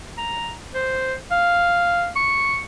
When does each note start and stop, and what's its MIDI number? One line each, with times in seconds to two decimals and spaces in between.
0.18 0.52 82
0.74 1.14 72
1.31 2.08 77
2.16 2.61 85